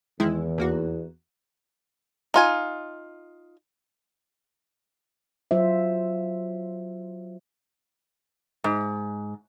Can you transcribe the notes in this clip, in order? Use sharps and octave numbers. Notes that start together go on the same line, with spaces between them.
E2 D#3 G#3 E4
D#2 A#3 F#4
D#4 F4 G#5
F#3 F4 C5 E5
G#2